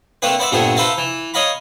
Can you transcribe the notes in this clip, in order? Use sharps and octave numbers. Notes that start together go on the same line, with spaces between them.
A3 A#3 C4 D4 B4
B3 C5 D5 E5
G2 A#2 A3 B3 C4 G#4
A4 B4 C5 E5 F5 A#5
E3
C#5 D#5 F5 A#5 B5